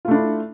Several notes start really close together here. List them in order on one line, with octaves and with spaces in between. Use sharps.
F4 A3 D4 E4